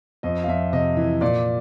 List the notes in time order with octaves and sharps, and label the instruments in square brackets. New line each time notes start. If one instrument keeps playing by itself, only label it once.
[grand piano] F2 D#5
F5
F2 E5
C3 D#5
E3
A#2 D5